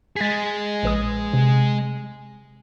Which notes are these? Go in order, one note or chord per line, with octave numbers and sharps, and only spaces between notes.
G#3 G#4 A6 B6
A#1 B4 D#6
C3